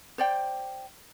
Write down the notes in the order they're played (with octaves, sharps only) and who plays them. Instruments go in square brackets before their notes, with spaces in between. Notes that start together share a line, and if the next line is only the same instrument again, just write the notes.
[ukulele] C5 D5 G5